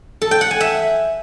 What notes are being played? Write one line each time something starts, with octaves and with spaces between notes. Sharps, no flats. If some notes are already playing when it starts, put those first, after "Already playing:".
A4
G5
F#5
G#5
E5